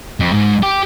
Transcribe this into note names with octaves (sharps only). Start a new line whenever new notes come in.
F2
G#2
G4